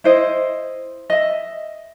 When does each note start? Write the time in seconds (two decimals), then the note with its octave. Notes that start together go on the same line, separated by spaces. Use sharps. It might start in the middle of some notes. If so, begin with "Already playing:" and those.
0.04 E4 C5 D#5
1.10 D#5 E5